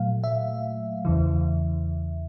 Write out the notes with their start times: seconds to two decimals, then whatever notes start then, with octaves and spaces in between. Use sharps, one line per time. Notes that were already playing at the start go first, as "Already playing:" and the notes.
Already playing: A#2 F#3 A3 F5
0.24 E5
1.05 E2 C#3 E3